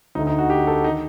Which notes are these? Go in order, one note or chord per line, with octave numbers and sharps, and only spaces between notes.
D2 D3 D#4
D#4
F#4
G4
A4
D#4
D#3